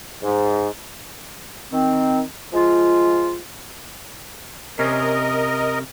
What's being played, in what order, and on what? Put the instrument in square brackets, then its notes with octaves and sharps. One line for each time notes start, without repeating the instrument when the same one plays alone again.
[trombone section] G#2
[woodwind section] D#3 C4
F3 G#3 F4
[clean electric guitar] C3 C#4 [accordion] A#4 D#5